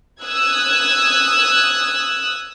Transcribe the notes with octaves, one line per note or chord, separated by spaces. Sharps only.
D#6 E6 F#6 G#6